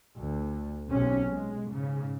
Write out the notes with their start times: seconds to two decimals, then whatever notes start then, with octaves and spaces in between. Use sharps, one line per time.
0.20 D2
0.89 B1 C3 C#4
1.29 G#3
1.69 G#2 C#3